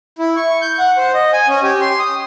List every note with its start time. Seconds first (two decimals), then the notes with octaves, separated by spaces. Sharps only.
0.18 E4
0.36 C#6
0.62 G6
0.79 F#5
0.97 C5
1.14 D#5
1.33 G#5
1.48 C#4
1.63 G4
1.81 C6
1.99 D#6